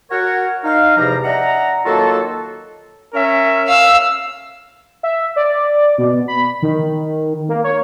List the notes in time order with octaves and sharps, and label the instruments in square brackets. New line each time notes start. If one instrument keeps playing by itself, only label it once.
[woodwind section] F#4 A#4 C#5 F#5
D#4 F5
E2 G#2 C3 F3 G3 A#5
D4 D#5 E5 F#5 A#5
D#3 F#3 A#3 F4 F#4 A4
[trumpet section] C#4 A#4 E5
[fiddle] F5 E6
[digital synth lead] E5
D5
B2
B5
D#3
A#3
C#5